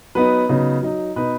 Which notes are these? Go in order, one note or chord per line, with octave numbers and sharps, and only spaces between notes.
F#3 B3 D#4 B4
C#3 F#3 B3 D#4
F#3 D#4
B2 B3 D#4 B4